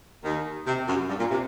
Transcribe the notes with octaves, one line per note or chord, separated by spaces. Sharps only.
D#2 D#3
C3
F#2
G2
A#2
C3